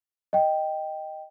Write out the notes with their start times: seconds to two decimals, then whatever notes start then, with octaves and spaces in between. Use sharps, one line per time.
0.33 D#5 G5